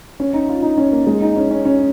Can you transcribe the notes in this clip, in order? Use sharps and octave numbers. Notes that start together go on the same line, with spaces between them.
C#4
D#4
F4
D#4
C#4
A#3
G#3
D#4
C#4
C#4
C#4